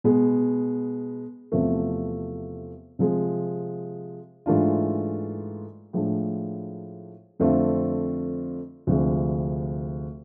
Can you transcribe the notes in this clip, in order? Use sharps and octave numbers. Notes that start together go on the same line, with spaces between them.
B2 G#3 B3
E2 C3 F3 A3
C3 F3 G#3
G#2 E3 A3 D4 F4
A2 F3 G#3 D4
F2 D3 A3 C4 F4
D2 C3 F3 G#3